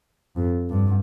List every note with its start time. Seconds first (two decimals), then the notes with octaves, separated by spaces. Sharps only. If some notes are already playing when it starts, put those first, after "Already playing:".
0.36 F2
0.70 G2